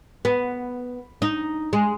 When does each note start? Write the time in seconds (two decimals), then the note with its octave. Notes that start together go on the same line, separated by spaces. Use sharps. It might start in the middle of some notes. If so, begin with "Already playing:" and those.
0.25 B3
1.22 D#4
1.73 G#3